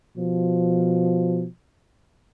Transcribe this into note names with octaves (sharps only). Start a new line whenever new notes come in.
B2 F3